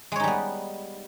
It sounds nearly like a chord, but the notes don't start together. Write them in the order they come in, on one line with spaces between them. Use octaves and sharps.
G#3 C#5 D#4 G3 B3